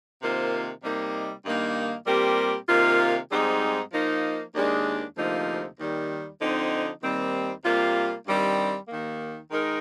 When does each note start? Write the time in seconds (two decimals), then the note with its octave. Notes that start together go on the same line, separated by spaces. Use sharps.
0.21 C3 D#3 A#3 F4 C5
0.83 C3 G3 A#3 D#4
1.45 G2 D#3 A#3 D#4
2.06 A#2 G3 C4 G4 A#4
2.68 C3 D#3 A#3 F4
3.31 G#2 G3 C4 D#4 G#4
3.93 F3 A#3 D#4
4.55 D#2 D#3 G#3 D4
5.16 D2 C3 F3 A#3 D#4
5.78 D#2 D#3 G3
6.40 D3 F3 C4 D#4
7.02 D#2 D#3 G3 C4
7.64 C3 G3 A#3 F4
8.26 G2 D#3 G3 C4
8.88 D#2 D#3 A#3
9.50 D#3 G#3 D#4 A#4